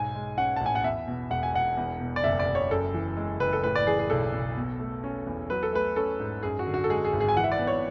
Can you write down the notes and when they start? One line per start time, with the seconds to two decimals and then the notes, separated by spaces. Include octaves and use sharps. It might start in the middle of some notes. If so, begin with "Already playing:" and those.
Already playing: B1 G#2 G#5
0.15 G#3
0.38 C#4 F#5
0.56 A5
0.61 A1
0.66 G#5
0.75 F#5
0.84 E2 E5
1.08 B2
1.30 E1 F#5
1.43 G#5
1.54 E1 F#5
1.77 E2
2.00 B2
2.16 D5
2.23 F#1 E5
2.39 D5
2.48 F#1
2.55 C#5
2.71 F#2 A4
2.94 E3
3.17 G#3
3.40 F#1 B4
3.53 A4
3.64 A2 B4
3.75 D5
3.87 E3 G#4
3.99 G#4
4.10 B1 A4
4.33 B1
4.57 B2
4.80 A3
5.04 C#4
5.26 E2
5.50 F#3 B4
5.63 A4
5.73 A3 B4
5.96 C#4 A4
6.20 G#2
6.43 F#2 G#4
6.59 F#4
6.66 D3
6.74 F#4
6.84 A4
6.90 G#3 G#4
7.05 G#4
7.13 G#1
7.20 G#4
7.29 G#5
7.37 E3 F#5
7.44 E5
7.52 D5
7.59 B3
7.67 C#5